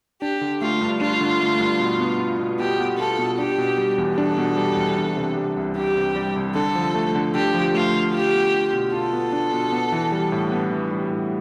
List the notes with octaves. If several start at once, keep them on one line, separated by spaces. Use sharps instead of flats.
D4 G4
D3
A3 F4
G2
D4 F4
D3
A3
G2
B2
B3
F4
B2
B2 G4
B3
F4 A4
B2
D4 G4
B2
G3
E2
D4 A4
B2
G3
E2
D4
C3
G3
C2
D4 G4
C3
G3
C2
D3 A4
F3
A3
D3
D3 G4
F3
A3 F4
D3
F4 G4
B3
D4
B2
F4 A4
B3
D4
B2
B3
E3
G3
A2
B3
E3
G3
A2